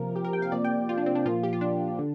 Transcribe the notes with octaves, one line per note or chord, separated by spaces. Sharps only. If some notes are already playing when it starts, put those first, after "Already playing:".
Already playing: C3 F3 A#3 A#4
G4
A#4
G5
F5
C3 F3 A#3 D5
G5
F4
D4
C4
D4
A#2 F3 A#3 F4
G4
F4
D4
D3